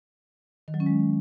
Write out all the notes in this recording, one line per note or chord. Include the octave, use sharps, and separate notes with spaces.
D#3
F#3
C#4
G#3